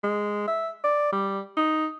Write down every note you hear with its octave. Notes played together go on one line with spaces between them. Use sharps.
G#3
E5
D5
G3
D#4